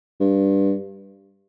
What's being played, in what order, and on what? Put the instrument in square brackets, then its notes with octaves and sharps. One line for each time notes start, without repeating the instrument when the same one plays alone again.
[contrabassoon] G2